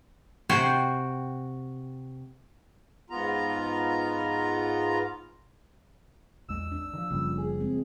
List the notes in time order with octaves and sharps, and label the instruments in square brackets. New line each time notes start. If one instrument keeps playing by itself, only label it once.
[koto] C3 F#4 C5 G5 G#5
[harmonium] G#2 B3 F4 A#5
[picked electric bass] A#1 E2 G#3 [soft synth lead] E6
[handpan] D4
[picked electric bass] D#3 F3
[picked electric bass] F#1 G3 [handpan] C#3 F3 A#3
[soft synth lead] G#4
[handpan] G#3 C4